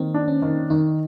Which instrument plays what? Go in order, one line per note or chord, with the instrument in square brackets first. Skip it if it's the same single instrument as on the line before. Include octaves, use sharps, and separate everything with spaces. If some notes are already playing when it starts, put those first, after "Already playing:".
Already playing: [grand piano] D#3 [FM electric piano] A#3 C4
[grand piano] D4
[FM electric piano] C#4
[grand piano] D#3
[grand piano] D#3 [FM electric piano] D#4